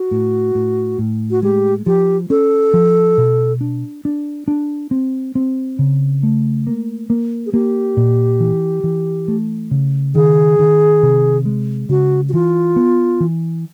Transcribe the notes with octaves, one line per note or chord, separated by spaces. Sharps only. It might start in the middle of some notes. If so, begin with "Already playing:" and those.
Already playing: F#4
A2
A2
A2
F#4
G#3 G4
F3 G4
C#4 A4
F3
B2
D4
D4
D4
C4
C4
C#3
A3
A#3
A#3
G#4
A#3 G4
A#2
E3
E3
A3
C#3
D#3 G#4
D#3
C3
G#3
C#3 F#4
F#4
E3 F4
B3
E3